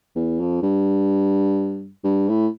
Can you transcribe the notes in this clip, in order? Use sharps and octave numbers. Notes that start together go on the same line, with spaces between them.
E2
F2
G2
G2
A2